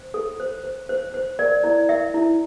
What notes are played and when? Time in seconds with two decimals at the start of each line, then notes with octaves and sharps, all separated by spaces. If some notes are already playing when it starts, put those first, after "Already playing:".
Already playing: C5
0.14 A4
0.40 C5
0.64 C5
0.89 C5
1.14 C5
1.39 A#4 D5
1.63 E4 D5
1.89 A#4 E5
2.14 E4